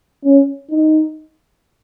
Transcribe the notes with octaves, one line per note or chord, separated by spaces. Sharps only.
C#4
D#4